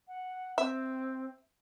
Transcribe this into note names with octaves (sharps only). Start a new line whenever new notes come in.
F#5
C4 E5